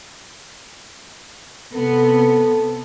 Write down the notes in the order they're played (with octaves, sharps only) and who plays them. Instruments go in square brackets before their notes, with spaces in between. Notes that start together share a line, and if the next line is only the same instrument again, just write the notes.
[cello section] C3 B3 [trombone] A4